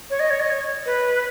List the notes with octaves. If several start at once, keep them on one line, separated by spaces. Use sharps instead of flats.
C#5
D#5
C#5
D#5
C#5
B4